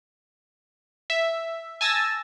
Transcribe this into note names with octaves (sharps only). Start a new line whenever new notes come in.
E5
G#5 A5 E6 A6 A#6